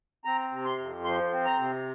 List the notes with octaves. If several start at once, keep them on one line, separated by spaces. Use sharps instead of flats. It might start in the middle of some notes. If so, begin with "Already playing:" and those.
C4 A#5
C3
C6
F2
F3 C6
C4
A#5
C3